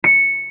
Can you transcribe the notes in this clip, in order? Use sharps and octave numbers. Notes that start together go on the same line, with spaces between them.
C#7